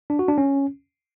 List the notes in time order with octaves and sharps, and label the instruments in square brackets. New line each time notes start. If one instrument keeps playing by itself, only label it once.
[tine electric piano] D4
F#4
D4
C#4